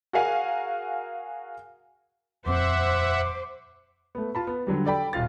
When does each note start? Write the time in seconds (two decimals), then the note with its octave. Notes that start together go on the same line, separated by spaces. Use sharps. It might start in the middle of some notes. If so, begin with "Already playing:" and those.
0.13 F#4 G#4 A#4 F5 G#5
2.46 D#1 F2 C4 C5 E5 F#5 D6
4.15 A3 B3
4.35 F4 A5 B5
4.47 B3
4.67 D3 F#3 G3
4.85 A4 D5 G5 B5
5.13 D#1 F4 F5 A6